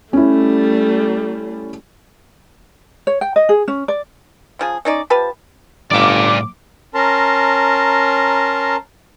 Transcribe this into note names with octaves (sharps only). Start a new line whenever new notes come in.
G3 A3 C#4 E4
C#5
G5
D#5
G#4
C#4
D5
C#3 F3 G#4
C#4 D#4 D5
F3 G4 B4 A5
G1 A2 G3 D5 F5 D6
C#4 A#4 A5 A#5 C6